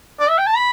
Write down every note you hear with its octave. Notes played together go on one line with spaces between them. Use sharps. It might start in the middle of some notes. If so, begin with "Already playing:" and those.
D5
E5
G5
A5
B5